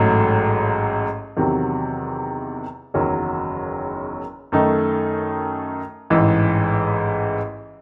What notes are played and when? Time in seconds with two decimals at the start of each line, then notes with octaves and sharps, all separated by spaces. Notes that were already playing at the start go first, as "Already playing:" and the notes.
Already playing: A1 G#2 F#3 A3
1.37 E2 C3 D#3 F#3
2.94 F#1 E2 D#3 F#3 C#4
4.52 F#2 D#3 A3 D#4
6.10 A1 G#2 E3